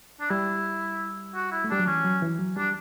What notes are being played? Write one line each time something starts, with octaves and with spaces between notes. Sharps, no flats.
D4
G3 E4
F#4
E4
A3
G3 D4
F#3
E3 C#4
F#3
E3
F#3
G3 D4